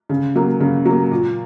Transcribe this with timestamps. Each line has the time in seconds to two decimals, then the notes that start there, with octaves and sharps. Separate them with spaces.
0.09 C#3
0.35 F#3 A#3
0.60 C#3
0.85 F#3 A#3
1.11 A#2